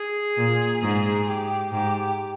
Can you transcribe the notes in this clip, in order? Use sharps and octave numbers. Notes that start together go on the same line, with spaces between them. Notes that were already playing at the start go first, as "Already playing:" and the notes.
Already playing: G#4
A#2
G#2
G4
G#2 G4